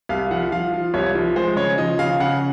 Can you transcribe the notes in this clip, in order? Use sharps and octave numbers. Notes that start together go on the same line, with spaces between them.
C2 F5
F3 F#5
F3 F5
F3
C2 C#5
F3
G#3 C5
C#3 C#5
F3 D#5
C#3 F5
C#3 F#5